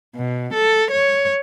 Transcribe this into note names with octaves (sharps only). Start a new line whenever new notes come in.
B2
A4
C#5